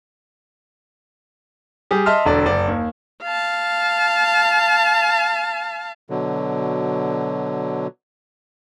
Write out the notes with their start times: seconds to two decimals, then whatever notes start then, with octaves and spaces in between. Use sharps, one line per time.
1.91 G3 G4 G#4
2.06 D#5 E5 A5 C6 F6
2.25 E1 D3 D5
2.45 F#1 D5
2.68 D#2
3.23 F5 A5
6.10 B2 D3 F#3